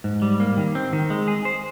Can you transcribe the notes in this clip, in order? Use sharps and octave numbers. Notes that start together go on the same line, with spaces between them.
G#2
G3
A#3
D#3
C4
D#3
G#3
G#4
C5